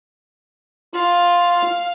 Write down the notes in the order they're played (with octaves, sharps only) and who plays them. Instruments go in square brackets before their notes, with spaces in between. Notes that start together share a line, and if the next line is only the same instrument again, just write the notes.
[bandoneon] F4 [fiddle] F5